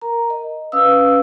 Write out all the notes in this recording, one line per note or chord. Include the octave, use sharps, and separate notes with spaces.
A#4 A#5
D#5
C#4 B4 F5 D#6 E6